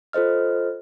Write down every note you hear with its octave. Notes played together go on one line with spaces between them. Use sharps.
F4 A4 C5 D#5 F6